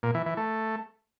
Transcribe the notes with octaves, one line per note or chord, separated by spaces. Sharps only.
A#2
E3
E3
A3